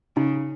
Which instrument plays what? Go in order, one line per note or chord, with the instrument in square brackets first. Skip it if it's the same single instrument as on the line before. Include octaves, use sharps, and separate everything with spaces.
[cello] C#3 [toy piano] D#4